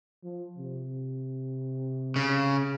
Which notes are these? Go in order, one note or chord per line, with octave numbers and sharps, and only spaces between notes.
F3
C3
C#3